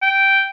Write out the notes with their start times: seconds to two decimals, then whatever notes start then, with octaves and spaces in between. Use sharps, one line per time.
0.02 G5